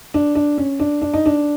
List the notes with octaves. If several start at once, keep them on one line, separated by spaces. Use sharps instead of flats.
D4
D4
C#4
D4
D4
D#4
D4